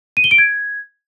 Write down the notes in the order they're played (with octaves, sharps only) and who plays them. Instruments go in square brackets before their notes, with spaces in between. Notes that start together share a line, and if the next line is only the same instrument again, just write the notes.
[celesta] D#7
G7
D7
G#6